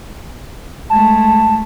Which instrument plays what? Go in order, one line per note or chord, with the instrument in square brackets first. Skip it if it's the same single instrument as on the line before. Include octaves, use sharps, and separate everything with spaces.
[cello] G#3 A3 [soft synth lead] A5